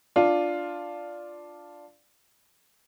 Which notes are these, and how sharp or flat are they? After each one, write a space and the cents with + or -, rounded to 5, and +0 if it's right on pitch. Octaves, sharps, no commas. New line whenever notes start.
D4 +0 F4 +0